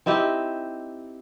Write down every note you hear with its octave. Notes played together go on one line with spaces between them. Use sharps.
C4 D#4 E4 G4